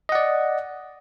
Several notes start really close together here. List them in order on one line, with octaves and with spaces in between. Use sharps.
D#5 F#5 D5